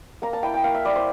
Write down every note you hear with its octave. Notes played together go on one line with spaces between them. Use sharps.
A#3 A#5
A5
E4 G5
G5
A#3 F5
E5
E4 D5
C5